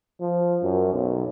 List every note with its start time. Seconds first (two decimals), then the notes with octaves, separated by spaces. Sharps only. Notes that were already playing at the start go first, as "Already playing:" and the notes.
0.21 F3
0.62 F#2
0.93 B1